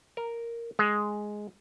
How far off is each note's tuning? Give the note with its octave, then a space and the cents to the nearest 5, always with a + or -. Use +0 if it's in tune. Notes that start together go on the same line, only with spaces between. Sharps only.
A#4 +0
G#3 +5